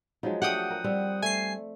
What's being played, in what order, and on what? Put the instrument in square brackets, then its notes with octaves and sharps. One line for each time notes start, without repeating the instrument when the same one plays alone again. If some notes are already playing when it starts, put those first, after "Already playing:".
[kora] F3 F#3 G#3 [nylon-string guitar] D#4
[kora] A3 D4 [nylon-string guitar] G4 [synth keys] F#5 G5 D#6
[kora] A#4
[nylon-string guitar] G3 [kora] C4
[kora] A3 [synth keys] G#5 C7